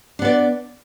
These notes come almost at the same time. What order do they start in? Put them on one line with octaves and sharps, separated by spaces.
D4 B3 D5